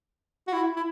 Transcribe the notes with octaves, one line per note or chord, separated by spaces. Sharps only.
F#4
E4
E4